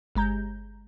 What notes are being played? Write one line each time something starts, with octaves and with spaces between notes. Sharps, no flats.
G1 G#3 A#5 G6